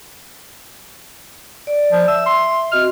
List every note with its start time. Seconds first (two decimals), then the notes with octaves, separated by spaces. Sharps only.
1.67 D5
1.92 F3
2.08 E5 E6
2.26 C6
2.72 C4 F#4 D#5 F6